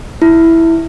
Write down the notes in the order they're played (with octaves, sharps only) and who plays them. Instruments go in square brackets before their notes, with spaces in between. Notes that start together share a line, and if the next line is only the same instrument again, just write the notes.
[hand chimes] E4